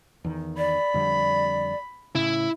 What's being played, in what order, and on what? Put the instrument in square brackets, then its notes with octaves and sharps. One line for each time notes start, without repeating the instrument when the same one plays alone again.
[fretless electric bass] E2 D#3
[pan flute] D5 [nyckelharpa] B5
[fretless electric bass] F2 D3 G3
[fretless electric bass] A2 C#3 [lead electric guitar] E4